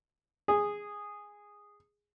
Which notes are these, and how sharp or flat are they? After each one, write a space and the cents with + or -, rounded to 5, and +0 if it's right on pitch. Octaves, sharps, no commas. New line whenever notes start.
G#4 -10